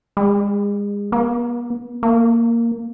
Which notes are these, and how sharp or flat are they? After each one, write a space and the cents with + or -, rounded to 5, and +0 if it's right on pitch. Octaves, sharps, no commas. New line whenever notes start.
G#3 -35
B3 -45
A#3 -5